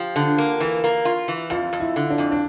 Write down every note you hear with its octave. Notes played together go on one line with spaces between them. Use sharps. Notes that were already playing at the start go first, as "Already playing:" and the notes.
Already playing: F3 F4 G4
D3
A#3
E3
A#3
F4
E3
F2 F4
F2
E4
D3
D4
F2
D4